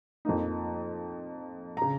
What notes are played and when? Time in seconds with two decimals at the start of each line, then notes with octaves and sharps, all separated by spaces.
0.25 F2 F3 A#3 D#4
1.77 C#3 A#5